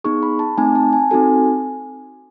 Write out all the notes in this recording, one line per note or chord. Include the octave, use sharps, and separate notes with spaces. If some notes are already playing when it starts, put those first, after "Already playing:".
B3 D#4 G#4 C#6
B5
A5
A3 C4 D#4 G#5
A5
G#5
C4 D#4 F#4 A4 G#5